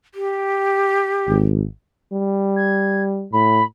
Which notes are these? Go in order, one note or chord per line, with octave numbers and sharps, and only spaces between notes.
G4
G#1
G3
G#6
A2 B5